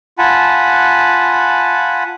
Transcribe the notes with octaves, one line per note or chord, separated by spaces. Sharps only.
F4 F#5 G#5 A5 B5